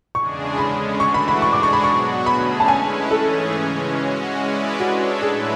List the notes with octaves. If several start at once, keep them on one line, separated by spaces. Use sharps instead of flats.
E2 C#3 G#3 D4 G#4 C#6
D3 G#3 C#4 B5
E3 A3 D4 F#4 C#6
B5
B5
G#2 G#3 D4 G#4 C#6
D6
C#6
B5
B2 F#3 B3 F#4 C#6
D3 A3 C#4 G#4 B5
A5
G#3 C#4 E4 B4 G#5
G#2 E3 A3 C#4 G#4 A4
C#3 E3 G#3 C#4
G#3 C#4 F#4
G#3 C#4 E4 B4 D5
G#3 D4 F#4 A4 C#5
A2 F#3 A3 E4 G#4 B4